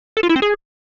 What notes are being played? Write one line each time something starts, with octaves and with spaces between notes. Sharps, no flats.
A4
F4
E4
C4
G#4